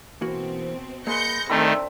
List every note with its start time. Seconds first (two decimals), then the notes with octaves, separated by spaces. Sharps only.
0.21 B2 E3 A#3 C4 F#4
1.07 G#3 A#3 B4 G6 A#6 C#7
1.50 C2 D#3 A3 C4 D4 E5 B5